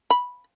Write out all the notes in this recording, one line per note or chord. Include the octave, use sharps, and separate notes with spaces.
B5